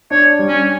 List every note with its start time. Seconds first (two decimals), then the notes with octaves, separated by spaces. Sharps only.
0.11 D4 C#5
0.39 G3
0.48 C#4